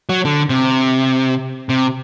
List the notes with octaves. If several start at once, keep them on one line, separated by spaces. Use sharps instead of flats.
F#3
D3
C3
C3